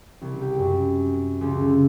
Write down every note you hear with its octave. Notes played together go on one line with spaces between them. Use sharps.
C2
G4
F#2
C#2
D3